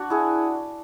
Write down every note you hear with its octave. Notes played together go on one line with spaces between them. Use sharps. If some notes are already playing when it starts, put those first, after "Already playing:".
Already playing: D4 F#4
E4 G#4